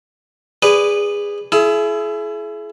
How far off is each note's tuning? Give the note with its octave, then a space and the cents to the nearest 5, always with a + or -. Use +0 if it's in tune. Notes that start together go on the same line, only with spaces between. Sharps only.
G#4 -20 B4 +10 D5 -10
E4 +25 G#4 +35